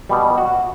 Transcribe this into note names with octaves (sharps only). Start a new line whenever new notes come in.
B2 G3
F#4